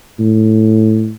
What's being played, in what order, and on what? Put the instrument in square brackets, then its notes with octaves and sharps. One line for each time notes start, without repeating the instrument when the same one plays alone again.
[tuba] A2